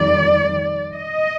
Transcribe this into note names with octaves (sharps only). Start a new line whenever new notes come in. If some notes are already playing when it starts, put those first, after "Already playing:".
Already playing: F2 D#3 G3 D5
D#5